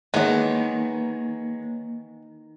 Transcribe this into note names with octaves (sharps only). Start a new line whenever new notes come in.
D#3 E3 G#3 A#3 B3 C#5